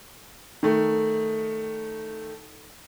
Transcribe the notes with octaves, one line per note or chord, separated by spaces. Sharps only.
D#3 A3